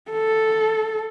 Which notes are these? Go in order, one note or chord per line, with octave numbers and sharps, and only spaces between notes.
A4